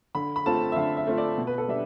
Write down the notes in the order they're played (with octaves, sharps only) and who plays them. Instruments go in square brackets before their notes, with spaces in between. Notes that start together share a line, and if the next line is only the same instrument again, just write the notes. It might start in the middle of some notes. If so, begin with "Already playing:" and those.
[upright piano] D3 B5
B5
A3 C4 F4 A5
E5
D3 F5
E5
A3 C4 F4
D5
B2
B4
A4
G3 D4 E5